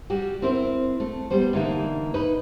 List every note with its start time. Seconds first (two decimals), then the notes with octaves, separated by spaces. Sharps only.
0.10 G3 F#4 G4
0.42 C4 E4 A#4 C5
1.00 A3
1.30 G3 B3 C5
1.53 D3 E3 A#3 D#4
2.14 D#4 B4